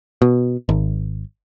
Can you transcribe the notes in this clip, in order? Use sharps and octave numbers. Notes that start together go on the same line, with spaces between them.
B2
G#1